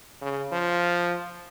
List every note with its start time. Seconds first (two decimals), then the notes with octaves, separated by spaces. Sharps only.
0.22 C#3
0.52 F3